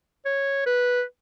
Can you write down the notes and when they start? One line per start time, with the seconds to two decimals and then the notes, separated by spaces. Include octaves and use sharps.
0.25 C#5
0.66 B4